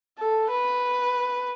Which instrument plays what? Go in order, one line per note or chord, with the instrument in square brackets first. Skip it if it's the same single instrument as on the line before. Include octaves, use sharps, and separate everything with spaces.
[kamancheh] A4
B4